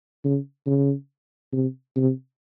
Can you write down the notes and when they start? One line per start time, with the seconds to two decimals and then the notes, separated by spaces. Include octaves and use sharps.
0.24 C#3
0.66 C#3
1.53 C3
1.96 C3